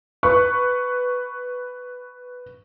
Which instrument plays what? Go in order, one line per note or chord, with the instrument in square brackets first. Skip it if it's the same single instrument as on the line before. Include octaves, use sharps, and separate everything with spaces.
[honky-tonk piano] B4 C#6